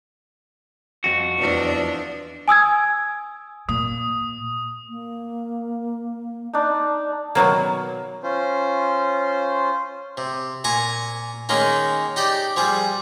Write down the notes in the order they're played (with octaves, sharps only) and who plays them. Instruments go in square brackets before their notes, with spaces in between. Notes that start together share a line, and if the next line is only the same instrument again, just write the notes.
[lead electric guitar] F2 F#4
[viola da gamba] E2 F3 D4
[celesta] G#5 D#6 E6 G#6
[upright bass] A#2 [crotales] D#6
[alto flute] A#3
[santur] D4 D#4
[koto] B2 D#3 F#3 A#3
[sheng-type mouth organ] C#4 F4 C5
[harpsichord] C3
A#2 G#5 A#5 C#6
D#3 G#3 A#3 C#4 D#4
D#4 G4 D5
F3 G3 G#4